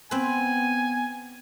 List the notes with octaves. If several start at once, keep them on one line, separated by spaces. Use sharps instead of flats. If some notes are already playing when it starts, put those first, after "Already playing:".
B3 C4 B4 G#5